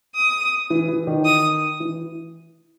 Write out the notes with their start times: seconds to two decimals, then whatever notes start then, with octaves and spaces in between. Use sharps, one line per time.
0.16 D#6
0.70 E3
0.88 E3
1.07 D#3
1.25 D#6
1.80 E3